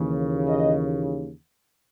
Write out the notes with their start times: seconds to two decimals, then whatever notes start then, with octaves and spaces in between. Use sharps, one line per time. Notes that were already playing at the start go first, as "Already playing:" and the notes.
Already playing: D#2 C#3 E3
0.47 D#5